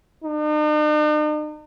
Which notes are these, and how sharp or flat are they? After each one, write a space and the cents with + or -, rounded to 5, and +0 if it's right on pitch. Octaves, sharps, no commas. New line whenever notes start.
D#4 -45